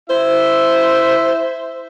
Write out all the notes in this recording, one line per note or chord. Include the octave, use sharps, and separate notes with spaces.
E4 C5 E5